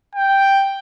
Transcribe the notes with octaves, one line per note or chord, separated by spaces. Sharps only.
G5